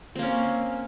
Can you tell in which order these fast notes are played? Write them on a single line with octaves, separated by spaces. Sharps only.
C4 A#3 C#4